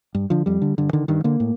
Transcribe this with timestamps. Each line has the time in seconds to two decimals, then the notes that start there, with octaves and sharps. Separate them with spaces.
0.15 G2
0.30 D3 F3
0.46 F2 G3
0.62 D3
0.78 G2 D3
0.93 D3 D#3
1.08 G2 D#3
1.24 D3 A#3
1.40 A2